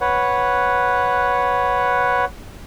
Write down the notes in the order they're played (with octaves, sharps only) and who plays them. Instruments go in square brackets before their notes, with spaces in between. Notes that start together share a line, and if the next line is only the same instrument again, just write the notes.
[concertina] B4 C#5 F#5